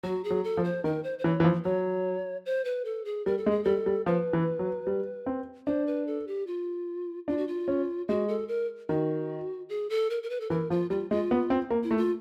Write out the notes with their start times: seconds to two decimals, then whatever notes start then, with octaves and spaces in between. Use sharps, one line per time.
0.03 F#3 F#4
0.24 G#4
0.30 F#3
0.44 A4
0.57 F3
0.64 C5
0.84 D#3 A#4
1.04 C5
1.19 C5
1.24 E3 C#5
1.40 E3
1.44 F3
1.65 F#3 C#5
2.46 C5
2.65 B4
2.85 A4
3.05 G#4
3.26 G3 A#4
3.38 A4
3.46 G#3
3.51 G#4
3.64 G3 A4
3.86 G3
4.06 F3 B4
4.33 E3
4.59 F#3
4.87 G3
5.26 C4
5.67 D4 C5
5.87 B4
6.07 A4
6.27 G4
6.47 F4
7.28 D4 F4
7.37 F#4
7.48 F4
7.68 C#4
8.08 G#3 F#4
8.28 A4
8.48 A#4
8.89 D#3 F#4
9.69 G#4
9.90 A4
10.10 A#4
10.23 A#4
10.30 B4
10.40 A4
10.50 E3 A#4
10.70 F3 F4
10.90 G3 F4
11.11 G#3 F4
11.31 B3
11.50 C4
11.71 A#3
11.83 E4
11.91 A3
11.97 F4